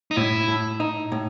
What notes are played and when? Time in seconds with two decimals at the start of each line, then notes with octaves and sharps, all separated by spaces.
0.11 D#4
0.16 A2 E4
0.48 A2
0.80 D#4
1.12 A2